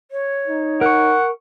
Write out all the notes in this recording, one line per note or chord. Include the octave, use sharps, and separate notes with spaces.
C#5
D#4
A#4 F#5 C#6